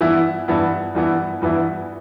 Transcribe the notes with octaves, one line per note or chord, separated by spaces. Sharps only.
G2 E3 B3 E4
G2 E3 B3 E4
G2 E3 B3 E4
G2 E3 B3 E4